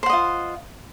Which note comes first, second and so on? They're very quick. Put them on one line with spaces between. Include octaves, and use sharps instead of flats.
C5 F#5 D#5 F4